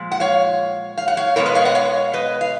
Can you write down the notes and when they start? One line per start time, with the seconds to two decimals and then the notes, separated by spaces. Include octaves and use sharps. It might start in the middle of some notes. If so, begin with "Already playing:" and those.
Already playing: A#2 F3 G#3
0.12 F#5
0.20 C#5 F5
0.97 F5
1.08 F#5
1.17 C#5 F5
1.36 B2 G#3 B3 A#4 C#5
1.46 B4 D#5
1.55 C#5 F5
1.65 D#5 F#5
1.75 C#5 F5
2.13 B4 D#5
2.41 F5